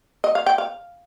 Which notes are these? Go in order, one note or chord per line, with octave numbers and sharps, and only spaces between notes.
D#5
F5
G5
F5